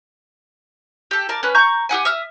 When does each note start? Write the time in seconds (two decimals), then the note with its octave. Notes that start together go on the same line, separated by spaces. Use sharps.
1.11 G4 A4
1.29 A#4 D5 A5
1.43 C#4 B4
1.55 A#5 C#6 G6
1.89 G4 G#4 F#5 G#5
2.05 E5 D#6 F6